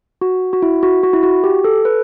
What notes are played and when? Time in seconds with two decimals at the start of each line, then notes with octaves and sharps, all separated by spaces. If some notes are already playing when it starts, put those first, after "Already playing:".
0.21 F#4
0.53 F#4
0.62 E4
0.83 F#4
1.03 F#4
1.13 E4
1.23 F#4
1.44 G4
1.64 A4
1.85 B4